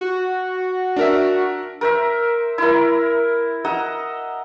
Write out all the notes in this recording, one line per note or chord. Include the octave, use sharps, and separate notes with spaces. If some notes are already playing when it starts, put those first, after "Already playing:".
F#4
D4 A#4 E5
A#4 C5 E5
E4 A#4
D#5 E5 F#5 A#5